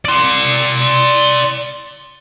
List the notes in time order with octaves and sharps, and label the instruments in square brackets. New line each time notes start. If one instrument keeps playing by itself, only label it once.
[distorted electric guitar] D5 C6